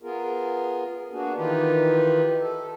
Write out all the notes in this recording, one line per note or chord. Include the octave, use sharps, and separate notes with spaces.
B3 F4 G#4 A#4
A#3 B3 D4 F#4 G#4
D#3 E3 D#4 F4 G4 B4
A4